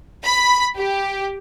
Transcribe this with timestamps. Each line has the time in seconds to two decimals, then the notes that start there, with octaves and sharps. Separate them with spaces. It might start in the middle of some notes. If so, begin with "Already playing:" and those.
0.24 B5
0.78 G4